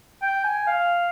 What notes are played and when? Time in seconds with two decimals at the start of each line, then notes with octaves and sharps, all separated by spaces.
0.22 G5
0.44 G#5
0.67 F5